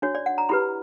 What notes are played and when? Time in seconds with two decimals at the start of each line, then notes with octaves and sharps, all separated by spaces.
0.02 D4 F#4 C#5
0.15 D5
0.26 F#5
0.38 A#5
0.49 E4 G4 B4 B5